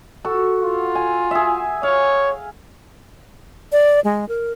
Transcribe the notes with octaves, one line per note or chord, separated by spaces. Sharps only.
F#4 A4
F4
G#5
G#4 E5
C#5 F5
D5
G#3
A#4